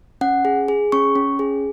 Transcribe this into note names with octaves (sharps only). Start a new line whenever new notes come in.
C#4 F#5
G#4
G#4
C#4 C#6
C#4
G#4